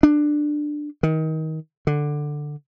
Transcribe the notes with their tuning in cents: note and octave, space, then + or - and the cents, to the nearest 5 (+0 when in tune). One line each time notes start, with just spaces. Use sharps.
D4 +15
D#3 +25
D3 +10